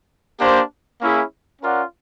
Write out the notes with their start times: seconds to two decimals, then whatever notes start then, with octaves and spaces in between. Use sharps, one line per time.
0.39 A#3 D4 G4 C5
1.01 A#3 C#4 E4 G#4
1.61 C#4 F4 A#4 D5 F#5